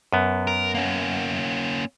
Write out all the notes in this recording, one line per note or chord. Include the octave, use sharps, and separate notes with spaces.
F#2 B3
A#4
A#3 C#4